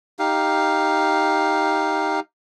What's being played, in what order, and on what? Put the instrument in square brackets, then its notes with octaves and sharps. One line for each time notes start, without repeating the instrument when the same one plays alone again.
[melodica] D#4 G4 F5